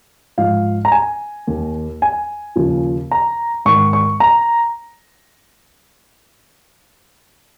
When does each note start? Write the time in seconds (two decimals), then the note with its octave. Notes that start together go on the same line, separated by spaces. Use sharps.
0.38 G#2 F3 F5
0.85 A#5
0.92 G#5
1.47 D#2 D#3
2.02 G#5
2.56 D#2 C#3 F3
3.11 A#5
3.65 G#2 D#3 C#6
3.93 C#6
4.20 A#5